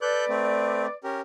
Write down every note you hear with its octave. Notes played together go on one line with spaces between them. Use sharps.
A4 B4 D5 F#6 G6
A3 C4
C#4 G4 A#4